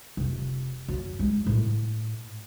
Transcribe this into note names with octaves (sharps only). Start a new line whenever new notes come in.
F1
F#2
G#3
A2